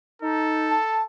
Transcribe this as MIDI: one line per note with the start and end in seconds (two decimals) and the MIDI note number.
0.22 0.76 63
0.22 1.05 69
0.69 1.01 81